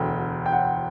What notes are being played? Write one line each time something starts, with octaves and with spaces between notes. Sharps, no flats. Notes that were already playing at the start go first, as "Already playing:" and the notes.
Already playing: E1 D2 D3 G5
G5
F#5